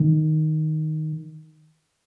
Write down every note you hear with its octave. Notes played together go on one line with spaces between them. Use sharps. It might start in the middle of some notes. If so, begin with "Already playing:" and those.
Already playing: D#3